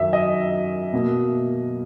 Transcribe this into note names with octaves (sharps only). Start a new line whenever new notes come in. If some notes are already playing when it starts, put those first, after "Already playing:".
Already playing: F#2 D#3 F#3 E5
D#5
B2 A#3